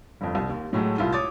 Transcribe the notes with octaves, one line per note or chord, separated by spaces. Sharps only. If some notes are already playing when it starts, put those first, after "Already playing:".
G1 F2
C2
D#2
A2 F#3 G#3 A3
C2 E4 F4
C#5 D6 D#6 A6